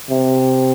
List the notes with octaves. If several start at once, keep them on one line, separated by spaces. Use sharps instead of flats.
C3